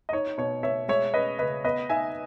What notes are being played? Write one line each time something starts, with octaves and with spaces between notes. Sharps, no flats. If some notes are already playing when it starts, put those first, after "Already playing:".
D#5
D#4 C#5
B2 C#5
B2 C#5 E5
G#3 C#5 E5
C#4 B4 D#5
C#3 B4 D#5
B3 B4 D#5
D#4 E5 G#5